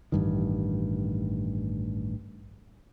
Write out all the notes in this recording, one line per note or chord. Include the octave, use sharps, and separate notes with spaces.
A1 G2 D#3